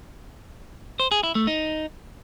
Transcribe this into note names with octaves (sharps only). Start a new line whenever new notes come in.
C5
G#4
E4
A3
D#4